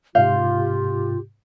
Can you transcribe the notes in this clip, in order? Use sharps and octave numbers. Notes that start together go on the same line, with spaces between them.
G#2 C3 F4 G4 F5 G6